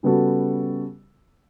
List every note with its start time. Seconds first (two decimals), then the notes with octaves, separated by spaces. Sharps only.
0.03 C#3 G3 B3 F#4 A4